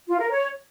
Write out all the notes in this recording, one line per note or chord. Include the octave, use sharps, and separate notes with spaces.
F4
A#4
C#5